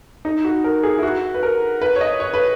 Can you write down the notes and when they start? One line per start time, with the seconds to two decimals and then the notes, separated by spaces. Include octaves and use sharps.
0.25 D#4
0.45 F#4
0.64 A#4
0.83 G#4
0.98 E4
1.03 F#4
1.34 B4
1.43 A#4
1.81 B4
1.96 C#5
2.01 D#5
2.20 C#5
2.34 B4